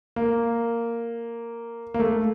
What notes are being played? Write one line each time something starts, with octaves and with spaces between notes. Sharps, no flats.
A#3
A#3
A3